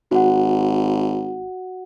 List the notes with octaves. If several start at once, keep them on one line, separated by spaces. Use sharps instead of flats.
G#1 F#4 F#5